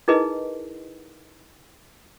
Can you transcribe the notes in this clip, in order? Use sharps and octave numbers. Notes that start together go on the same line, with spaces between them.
D#4 E4 G#4 A#4 B4 D#5